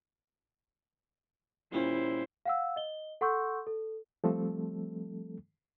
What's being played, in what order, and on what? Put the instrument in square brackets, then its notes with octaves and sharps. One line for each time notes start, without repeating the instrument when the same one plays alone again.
[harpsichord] A#2 G3 C#4 [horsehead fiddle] E4 C5
[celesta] F5 F#5 E6
D#5 G7
A4 F#5 C6 C#6 E6 G6
A4
[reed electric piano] F3 G3 A3 C4 A4